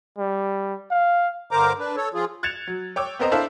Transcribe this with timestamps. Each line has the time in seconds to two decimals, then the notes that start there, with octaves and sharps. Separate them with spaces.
0.18 G3
0.91 F5
1.51 G2 D3 A#4 C5 A#5 D6
1.79 D4 B4
1.96 A4 C#5
2.14 F3 F4 G#4
2.43 F#6 G#6 A6 C#7 E7 F7
2.67 F#3
2.96 C#5 G5 D6 E6
3.19 B3 C4 A#4 C5 D#5 A#5
3.32 D4 E4 A4 C5 E5 F5